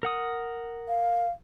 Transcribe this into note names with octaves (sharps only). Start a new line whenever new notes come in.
A#4 F#5 D#6
F5